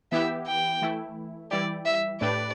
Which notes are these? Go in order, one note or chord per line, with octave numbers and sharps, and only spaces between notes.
E3 B3 E4 G4 E5
G5
E3 A3 E4
E3 G3 E4 G4 D5
E5
A2 A3 D4 G4 B4 D5